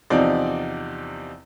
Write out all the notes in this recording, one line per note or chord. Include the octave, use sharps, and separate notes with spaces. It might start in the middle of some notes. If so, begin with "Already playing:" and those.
E2 C3 F3 C4 D#4 D5